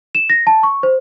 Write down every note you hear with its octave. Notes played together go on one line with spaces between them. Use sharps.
E7
A#6
A5
C#6
C5